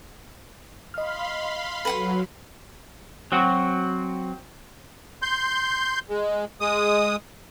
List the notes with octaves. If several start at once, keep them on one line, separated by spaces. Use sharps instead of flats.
D#5 F5 B5 C6 F6
F#3 A4 B4 F#5 B5
F#3 C4 F#4
C6 G6
G#3
G#3 D#6